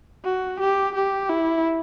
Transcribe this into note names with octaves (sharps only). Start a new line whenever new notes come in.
F#4
G4
G4
E4